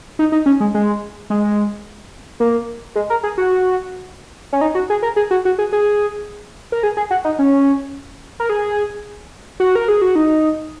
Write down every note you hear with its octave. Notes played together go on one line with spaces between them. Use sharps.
D#4
D#4
C#4
G#3
G#3
G#3
A#3
G#3
A#4
G#4
F#4
C#4
D#4
F#4
G#4
A#4
G#4
F#4
F#4
G#4
G#4
A#4
G#4
G#4
F#4
D#4
C#4
A#4
G#4
F#4
A#4
G#4
F#4
D#4